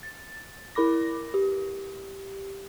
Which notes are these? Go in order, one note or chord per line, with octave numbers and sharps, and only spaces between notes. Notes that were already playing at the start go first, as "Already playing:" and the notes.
A6
E4 A#4 B5 D6 A#6
G4